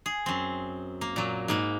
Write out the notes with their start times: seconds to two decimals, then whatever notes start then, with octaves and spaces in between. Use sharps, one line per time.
0.06 G#4
0.26 F#2 C4
1.01 A#3
1.16 A#2 F#3
1.48 G#2 A#3 B5